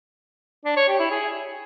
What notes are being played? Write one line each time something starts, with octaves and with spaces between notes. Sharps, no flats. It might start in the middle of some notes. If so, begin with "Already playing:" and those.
D4
C#5
G4
E4
G#4